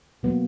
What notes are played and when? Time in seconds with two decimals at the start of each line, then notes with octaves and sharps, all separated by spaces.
0.23 B2 F#3 A#3 B3